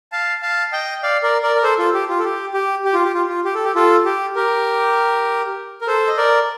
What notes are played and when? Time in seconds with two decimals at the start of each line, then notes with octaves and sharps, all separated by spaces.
0.12 F5 A5
0.42 F5 A5
0.72 D#5 G5
1.03 D5 F5
1.23 A#4 D5
1.43 A#4 D5
1.56 A#4
1.63 A4 C5
1.79 F4 A4
1.94 G4
2.09 F4
2.19 A4
2.24 G4
2.54 G4
2.85 G4
2.94 F4
3.04 G4
3.14 F4
3.29 F4
3.44 G4
3.55 A4
3.64 G4
3.75 F4 A4
4.05 G4
4.35 G4 A#4
5.81 A#4
5.87 A4 C5
6.08 D#5
6.17 A#4 D5